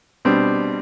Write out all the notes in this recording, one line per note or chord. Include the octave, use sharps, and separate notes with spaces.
B2 G3 C4 D4